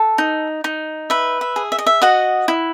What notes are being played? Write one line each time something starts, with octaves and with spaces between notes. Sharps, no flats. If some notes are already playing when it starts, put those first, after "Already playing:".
Already playing: A4 F#5
D#4
D#4
B4 E5
E5
G#4
E5
D#5
E5
F#4 D#5 F#5
E4